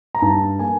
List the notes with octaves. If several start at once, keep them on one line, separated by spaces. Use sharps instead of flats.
A#5
G2 A5
A#3 G#5